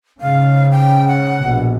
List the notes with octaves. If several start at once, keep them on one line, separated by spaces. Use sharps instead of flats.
G#2 C#3 F5
G5
F#5
A#1 B2